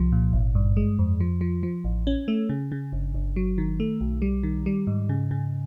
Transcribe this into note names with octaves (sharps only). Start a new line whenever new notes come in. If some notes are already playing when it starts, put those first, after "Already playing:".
Already playing: C2 F3
A#2
G#1
G2
G#3
F2
F3
F3
F3
A1
C#4
A3
C#3
C#3
G1
G1
F#3
D#3
A3
B1
G3
D#3
G3
G#2
C#3
C#3